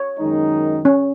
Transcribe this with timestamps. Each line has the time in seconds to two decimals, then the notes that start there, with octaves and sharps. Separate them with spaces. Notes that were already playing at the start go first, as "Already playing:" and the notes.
Already playing: C#5
0.18 F#2 D#3 G#3 D#4
0.85 C#4